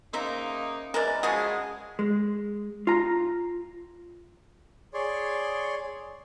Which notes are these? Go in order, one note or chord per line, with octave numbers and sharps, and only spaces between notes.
C#3 A#3 D#4 C5 E5 A#5
E3 G#3 A#4 D5
C#3 F3 G#3 F#4 G#4
G#3
F4 A#5
G#4 C#5 D5 C6